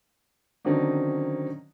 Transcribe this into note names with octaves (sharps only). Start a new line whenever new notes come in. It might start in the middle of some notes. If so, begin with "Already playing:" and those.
D3 D#3 F#3 C4 C#4 D#4